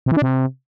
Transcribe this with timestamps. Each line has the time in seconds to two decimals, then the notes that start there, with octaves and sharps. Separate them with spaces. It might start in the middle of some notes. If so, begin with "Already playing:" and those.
0.06 C3
0.12 E3
0.17 D4
0.22 C3